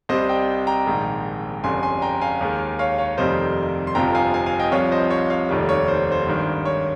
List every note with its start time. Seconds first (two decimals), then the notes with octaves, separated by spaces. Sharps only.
0.09 C2 C3 G3 C5 D#5
0.29 D#5 G5
0.67 G5 A#5
0.87 A#1 G#2 D#3
1.64 G1 F2 C#3 G3 G#5 C6
1.83 G#5 C6
2.02 G5 A#5
2.21 F5 G#5
2.41 D#2 D#3 G#3
2.79 C#5 F5
2.98 C#5 F5
3.18 F1 F2 C3 D#3 G3 C5 D#5
3.87 C6
3.95 G1 F2 C3 F3 G5 A#5
4.15 F5 G#5
4.34 F5 G#5
4.46 F5 G#5
4.60 D#5 G5
4.72 C2 C3 F3 C#5 F5
4.92 C5 D#5
5.11 C#5
5.30 C#5 F5
5.49 F1 D#2 D#3 G3
5.69 C#5
5.88 C5
6.12 C5
6.26 G#1 G2 D#3
6.66 C#5